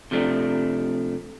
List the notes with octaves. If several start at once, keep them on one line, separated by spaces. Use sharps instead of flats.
C3 F3 A3 D4